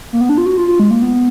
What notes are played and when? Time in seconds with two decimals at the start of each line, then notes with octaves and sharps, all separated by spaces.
0.13 A#3
0.21 B3
0.29 D4
0.38 F4
0.46 F#4
0.57 F4
0.68 F4
0.80 G#3
0.91 A#3
1.02 B3